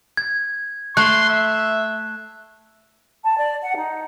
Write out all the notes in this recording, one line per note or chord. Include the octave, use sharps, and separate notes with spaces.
G#6
A3 C6 F#6
E5
A5
D5
F#5
D#4